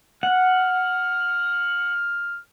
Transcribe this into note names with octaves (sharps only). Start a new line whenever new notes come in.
F#5 F6